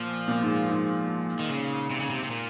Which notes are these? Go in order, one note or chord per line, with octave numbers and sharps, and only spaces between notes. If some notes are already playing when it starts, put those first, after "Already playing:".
Already playing: A#2 F3
A#2
G#2
G#2
D#3
C#3
C3
C#3
C3
C3
A#2